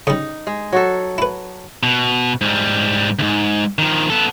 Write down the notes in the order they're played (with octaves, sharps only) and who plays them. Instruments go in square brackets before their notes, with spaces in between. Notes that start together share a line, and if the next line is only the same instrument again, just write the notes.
[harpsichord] C#3 G3 [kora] D#4
[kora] G#3
F#3 F#4 A4
[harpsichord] E4 B4
[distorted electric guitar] B2
G#2 G3
D2 G#2
D#3 F3
B3 A4